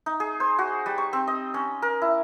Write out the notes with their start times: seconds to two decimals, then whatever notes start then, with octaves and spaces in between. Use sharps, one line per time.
0.06 D#4
0.20 G#4
0.40 C5
0.59 F#4
0.86 G3
0.98 C#6
1.13 C4
1.28 D#5
1.54 C#4
1.82 A#4
2.02 E4